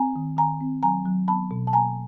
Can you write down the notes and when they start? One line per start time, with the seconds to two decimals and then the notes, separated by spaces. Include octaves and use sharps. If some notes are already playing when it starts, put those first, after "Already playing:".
Already playing: C4 G#5 A#5
0.16 D#3
0.37 D#3 G#5 A#5
0.61 C4
0.83 F#3 G#5 A#5
1.06 F#3
1.28 B3 A5 B5
1.51 B2
1.67 A5
1.73 A#3 G#5 A#5